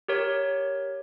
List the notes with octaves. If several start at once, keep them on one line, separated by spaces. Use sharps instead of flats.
G4 A#4 C#5